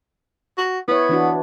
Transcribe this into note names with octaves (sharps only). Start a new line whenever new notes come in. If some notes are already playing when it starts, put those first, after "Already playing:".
F#4
B3 E4 C#5
E3 D4 F#4